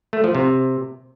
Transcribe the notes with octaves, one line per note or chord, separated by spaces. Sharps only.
A3
F3
C3